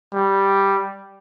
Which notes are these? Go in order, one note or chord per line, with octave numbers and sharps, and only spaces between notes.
G3